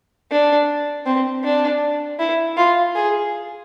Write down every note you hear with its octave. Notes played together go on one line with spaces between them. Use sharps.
D4
C4
D4
E4
F4
G#4